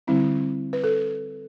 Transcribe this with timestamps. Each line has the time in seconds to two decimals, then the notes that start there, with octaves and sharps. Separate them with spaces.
0.07 D3 G3 C4 E4
0.73 B4
0.84 A4